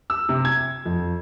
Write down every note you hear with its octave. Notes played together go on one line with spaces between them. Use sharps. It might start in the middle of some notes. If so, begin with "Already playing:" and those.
E6
C3
G#6
F2